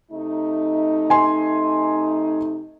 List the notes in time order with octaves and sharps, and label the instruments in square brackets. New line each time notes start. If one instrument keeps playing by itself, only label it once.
[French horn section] C3 A3 D#4
[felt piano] G#5 C6